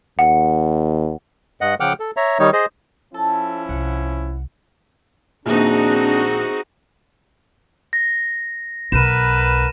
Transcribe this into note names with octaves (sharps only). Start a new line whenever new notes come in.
D#2 F#5
G2 D#5 F#5
C#3 F3 F#5 G5 D6 F6
A4
C#5 E5 A#5
D#3 G3 D#4 C#5
G#4 C5 D#5
F3 C#4 E4 A4
C2 F#5
A#1 D#2 C4 D4 D#4 F#4 G#4
A#6
B1 B3 A#4 B4 D#7 E7